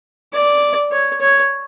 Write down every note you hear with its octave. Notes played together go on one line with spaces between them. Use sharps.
D5
C#5
C#5